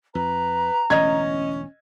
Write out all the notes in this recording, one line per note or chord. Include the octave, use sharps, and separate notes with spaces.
F2 B4 A#5
E1 A1 D3 C#4 D#5 G#6